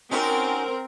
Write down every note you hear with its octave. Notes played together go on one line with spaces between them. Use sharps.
C4 C#4 D#4 F#4 A#4